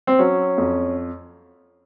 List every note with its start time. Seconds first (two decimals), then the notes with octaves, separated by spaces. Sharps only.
0.07 C4
0.19 F#3 C#4
0.58 F2